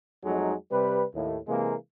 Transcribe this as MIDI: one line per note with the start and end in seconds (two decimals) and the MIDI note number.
0.23 0.53 41
0.23 0.53 54
0.23 0.53 56
0.23 0.53 57
0.23 0.53 63
0.71 1.05 48
0.71 1.05 55
0.71 1.05 71
1.14 1.37 39
1.14 1.37 45
1.47 1.75 48
1.47 1.75 52
1.47 1.75 56
1.47 1.75 58